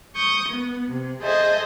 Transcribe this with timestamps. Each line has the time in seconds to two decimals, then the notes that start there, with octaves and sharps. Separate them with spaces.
0.15 C#6 D#6 G6
0.50 B3
0.90 C3
1.22 G#4 A4 C5 D#5 E5